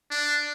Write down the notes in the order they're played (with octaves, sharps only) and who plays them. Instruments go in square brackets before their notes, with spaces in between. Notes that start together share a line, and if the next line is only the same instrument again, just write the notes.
[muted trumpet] D4